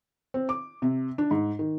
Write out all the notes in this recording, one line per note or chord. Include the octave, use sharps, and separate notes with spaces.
C4
D6
C3
D4
G#2
D#3